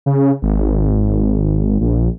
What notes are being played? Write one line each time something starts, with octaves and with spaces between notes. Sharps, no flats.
C#3
G#1
A#1